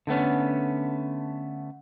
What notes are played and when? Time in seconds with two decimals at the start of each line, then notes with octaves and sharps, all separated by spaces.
0.07 D3 A3 B3 C#4